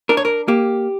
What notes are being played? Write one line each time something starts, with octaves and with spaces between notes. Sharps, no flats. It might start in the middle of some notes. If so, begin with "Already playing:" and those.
D4 A#4
C#5
A#4
A#3 G4